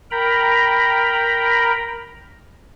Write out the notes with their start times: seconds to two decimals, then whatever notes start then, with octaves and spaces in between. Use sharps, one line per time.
0.11 A#4 G5 A#5 B5